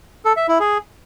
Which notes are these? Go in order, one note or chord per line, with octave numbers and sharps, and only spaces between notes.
A4
E5
E4
G#4